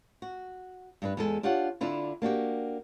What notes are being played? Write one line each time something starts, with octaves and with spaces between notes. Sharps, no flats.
F#4
G2 D4 B4
E2 G#3 A4
D4 F4 G4 C#5 F#5
D3 D4 E4 F4
A#3 D4 F#4 G4